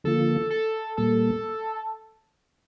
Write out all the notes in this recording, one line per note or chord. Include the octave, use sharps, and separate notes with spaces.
D3 F3 A#3 F4 A4
A4
A#2 G3 A#3 A4